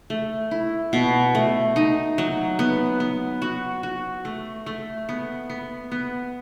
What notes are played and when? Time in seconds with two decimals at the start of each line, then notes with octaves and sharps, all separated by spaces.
0.10 A3
0.51 E4
0.93 B2
1.35 A3
1.76 D#4
2.18 F#3
2.59 B3
3.00 B3
3.42 F#4
3.83 F#4
4.25 A3
4.66 A3
5.09 B3
5.50 B3
5.91 B3